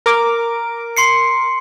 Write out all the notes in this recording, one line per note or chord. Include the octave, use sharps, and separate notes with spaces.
A#4 D6
C6 C7 C#7